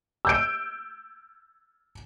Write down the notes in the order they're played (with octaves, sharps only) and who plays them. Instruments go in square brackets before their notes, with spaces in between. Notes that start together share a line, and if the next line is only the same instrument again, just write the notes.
[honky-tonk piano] E6 G6 D7